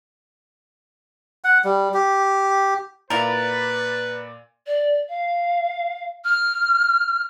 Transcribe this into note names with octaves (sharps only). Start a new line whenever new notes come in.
F#5
G3
G4
A#2 A#3 E4 A#4 B4 D5 A6
D5
F5
F6